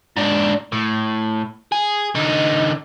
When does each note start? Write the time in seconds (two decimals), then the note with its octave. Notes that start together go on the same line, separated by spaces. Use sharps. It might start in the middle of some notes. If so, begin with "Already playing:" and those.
0.16 G#2 D4
0.72 A2
1.72 G#4
2.15 D3 D#4